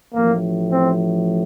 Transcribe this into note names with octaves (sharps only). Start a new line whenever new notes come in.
A1 A2 F3 A#3
C4